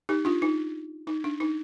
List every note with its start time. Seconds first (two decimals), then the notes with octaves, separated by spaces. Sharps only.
0.09 D#4 G4
0.25 D4 F4
0.42 D#4
1.07 D#4
1.24 D4
1.40 D#4